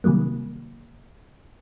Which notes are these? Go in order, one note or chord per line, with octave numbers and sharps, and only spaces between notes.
C3 D#3 F#3 G3 A#3